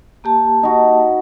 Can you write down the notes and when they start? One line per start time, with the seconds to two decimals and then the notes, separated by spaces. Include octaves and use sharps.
0.24 A#3 G4 A5
0.63 D#4 F#4